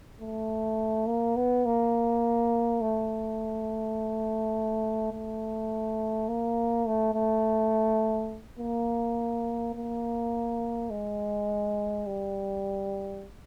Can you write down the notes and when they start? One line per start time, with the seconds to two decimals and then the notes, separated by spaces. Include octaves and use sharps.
0.20 A3
1.08 A#3
1.36 B3
1.65 A#3
2.81 A3
5.12 A3
6.28 A#3
6.86 A3
7.14 A3
8.59 A#3
9.75 A#3
10.90 G#3
12.06 G3